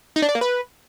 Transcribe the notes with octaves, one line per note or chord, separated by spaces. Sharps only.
D#4
D4
D5
A#3
B4